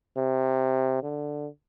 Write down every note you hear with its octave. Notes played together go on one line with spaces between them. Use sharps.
C3
D3